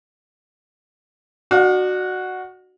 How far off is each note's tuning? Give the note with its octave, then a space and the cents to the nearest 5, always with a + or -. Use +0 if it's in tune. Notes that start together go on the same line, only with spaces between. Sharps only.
D4 +35 F#4 +0 F5 +40